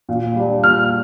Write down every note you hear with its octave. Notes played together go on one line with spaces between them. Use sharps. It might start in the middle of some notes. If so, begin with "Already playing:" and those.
A#2
G3 D4
A#2 F6